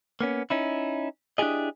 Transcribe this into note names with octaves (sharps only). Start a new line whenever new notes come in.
A#3 B3 C#4
C#4 D#4 E4
D4 E4 F4 G4 G#4 D#5